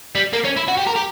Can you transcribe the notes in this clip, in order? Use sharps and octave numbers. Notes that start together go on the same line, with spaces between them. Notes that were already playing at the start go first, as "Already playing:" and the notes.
G3
A#3
C#4
E4
F#4
G4
A#4
G4